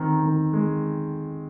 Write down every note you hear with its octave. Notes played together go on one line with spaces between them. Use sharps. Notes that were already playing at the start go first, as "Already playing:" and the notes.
Already playing: D#3 C4
D#3
G#3